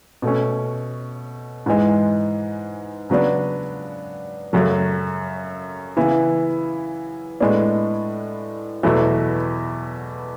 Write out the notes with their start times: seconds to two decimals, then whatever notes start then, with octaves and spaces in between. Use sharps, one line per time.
0.22 B2 A3 C#4
1.66 G#2 E3 G#3
3.10 C#3 F#3 B3 D4
4.53 F#2 C#3 F#3 A3
5.97 C#3 E3 B3 E4
7.40 A2 G#3 B3 D4
8.83 E2 B2 F#3 A3 E4